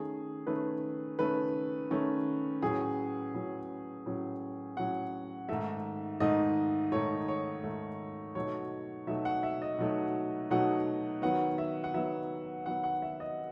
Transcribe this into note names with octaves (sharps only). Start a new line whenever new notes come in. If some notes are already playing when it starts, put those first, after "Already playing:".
Already playing: D#3 A3 C#4 G#4
D#3 A3 C#4 B4
D#3 A3 C#4 B4
D#3 A3 C#4
A2 F#3 C#4 G#4
A2 F#3 C#4
A2 F#3 C#4
A2 F#3 C#4 F#5
G#2 D#3 A3 E5
G#2 D#3 A3 D#5
G#2 D#3 A3 C#5
C#5
G#2 D#3 A3
B2 F#3 A3 D#4 C#5
B2 F#3 A3 D#4 E5
F#5
E5
D#5
B2 F#3 A3 D#4
B2 F#3 A3 D#4 F#5
D#3 F#3 B3 F#5
E5
F#5
D#3 F#3 B3 E5
D#3 F#3 B3 F#5
F#5
E5
D#5